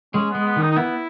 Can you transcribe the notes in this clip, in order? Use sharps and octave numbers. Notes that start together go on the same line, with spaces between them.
G#3 C#4
G#3 B3
B3
D#3 D#4
D#4
B3 E4